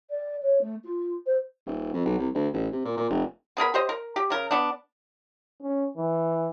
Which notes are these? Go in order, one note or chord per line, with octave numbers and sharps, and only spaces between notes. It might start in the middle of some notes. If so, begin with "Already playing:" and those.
D5
C#5
A3
F4
C5
D#1
F2
B1
C2
D2
A1
C3
A#2
A#2
F1
B3 G#4 A#4 B5
G4 C5 D#5
A#4
G4
C#3 A#4
B3 D4
C#4
E3